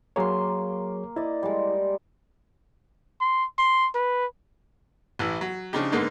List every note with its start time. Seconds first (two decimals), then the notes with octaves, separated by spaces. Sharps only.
0.16 F#3 A#3 G#4 C#5 C6
1.16 E4 D5 D#5
1.43 G3 G#3
3.21 C6
3.58 C6
3.95 B4
5.19 A1 E3 E4
5.41 F#3
5.73 C#3 F3 D4 D#4 G4
5.92 G#2 D3 A#3 B3 D4 D#4